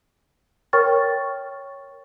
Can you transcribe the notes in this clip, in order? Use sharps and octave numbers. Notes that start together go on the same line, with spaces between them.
A#4 C#5 G5 C#6 F6 A6